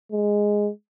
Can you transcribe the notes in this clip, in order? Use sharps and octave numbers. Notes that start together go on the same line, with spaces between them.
G#3